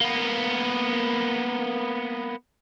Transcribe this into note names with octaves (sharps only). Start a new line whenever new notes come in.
A#3 B3